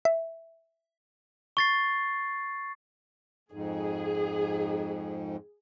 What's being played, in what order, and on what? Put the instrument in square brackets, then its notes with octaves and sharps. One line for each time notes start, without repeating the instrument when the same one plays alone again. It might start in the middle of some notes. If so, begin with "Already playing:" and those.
[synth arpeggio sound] E5
[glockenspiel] C#6 A6 C7
[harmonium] F2 G#2 [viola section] G#4